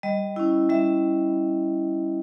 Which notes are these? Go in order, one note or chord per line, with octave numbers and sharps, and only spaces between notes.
G3 D#5
C#4 E4
G3 E5